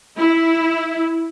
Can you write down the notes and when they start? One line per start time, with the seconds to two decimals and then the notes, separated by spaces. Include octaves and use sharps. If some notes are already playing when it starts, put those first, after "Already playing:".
0.17 E4